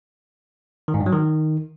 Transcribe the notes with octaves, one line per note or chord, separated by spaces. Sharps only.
D#3
G#2
G2
F#3
D#3